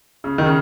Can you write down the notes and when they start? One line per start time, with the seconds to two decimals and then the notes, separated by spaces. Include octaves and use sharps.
0.24 C#3
0.38 D#3
0.46 C#3